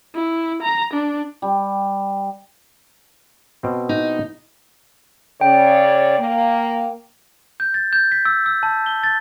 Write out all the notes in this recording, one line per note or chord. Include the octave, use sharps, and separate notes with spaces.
E4
A#5
D4
G3
B2 C4
D#4
C#3 C#5 D5 G5
A#3
G6
A6
G6
B6
E6
E6
A5
G7
A6